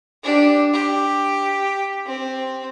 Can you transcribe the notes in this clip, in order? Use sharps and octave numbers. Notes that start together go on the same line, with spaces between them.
D4 G4
G4
C4